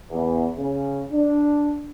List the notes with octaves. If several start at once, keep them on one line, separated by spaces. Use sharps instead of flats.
E2
C#3
D4